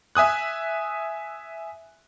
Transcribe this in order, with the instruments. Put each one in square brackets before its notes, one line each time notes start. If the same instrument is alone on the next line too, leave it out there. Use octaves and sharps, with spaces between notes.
[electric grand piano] E5 G#5 D#6 F#6